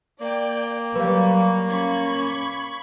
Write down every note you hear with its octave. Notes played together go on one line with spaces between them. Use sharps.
A#3 D5 G5
F#3 G3 B4 F5 C#6
C#4 B5 C#6 G#6